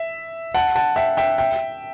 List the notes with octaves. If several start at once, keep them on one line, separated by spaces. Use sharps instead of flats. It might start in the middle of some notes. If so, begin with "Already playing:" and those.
Already playing: E5
F#5 A5
F#5 A5
E5 G5
E5 G5
E5 G5